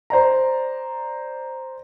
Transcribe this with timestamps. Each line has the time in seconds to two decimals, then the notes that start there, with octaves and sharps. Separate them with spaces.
0.10 C5 D5 A#5